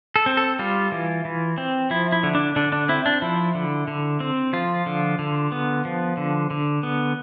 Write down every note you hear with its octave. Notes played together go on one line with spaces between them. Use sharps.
A4
C4
A4
G3 F4
E3
E3
C4
F3 E4
E4
D3
D4
D3 D4
D4
C4 E4
D4
F3 E4
D3
D3
C4
F3 F4
D3
D3
B3
F3
D3
D3
B3